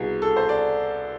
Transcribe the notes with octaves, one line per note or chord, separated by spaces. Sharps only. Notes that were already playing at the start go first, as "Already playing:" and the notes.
Already playing: C2 B2 G#4
A4
C5
D5